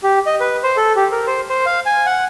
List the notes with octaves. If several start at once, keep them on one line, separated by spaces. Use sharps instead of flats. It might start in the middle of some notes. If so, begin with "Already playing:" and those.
G4
D#5
B4
C5
A4
G4
A#4
C5
C5
F5
G#5
F#5